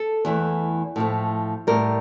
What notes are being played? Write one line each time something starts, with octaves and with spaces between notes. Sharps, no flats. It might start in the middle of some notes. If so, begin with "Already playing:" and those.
Already playing: A4
E2 E3 A3
A2 F3 A3
A2 G3 A#4